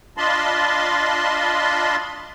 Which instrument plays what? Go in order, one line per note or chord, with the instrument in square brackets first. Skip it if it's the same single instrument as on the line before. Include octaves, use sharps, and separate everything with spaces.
[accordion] D4 F4 D#5 A5 B5 C6